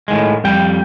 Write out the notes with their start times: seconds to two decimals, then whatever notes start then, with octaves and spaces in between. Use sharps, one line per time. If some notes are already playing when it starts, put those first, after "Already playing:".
0.08 A2 D#3 G#3
0.44 F2 G3 G5